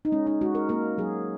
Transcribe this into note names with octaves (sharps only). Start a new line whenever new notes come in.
D#4
G#3 C#4
D#4
G#3 F#4
A#4
A#3 A#4
F#3 G#4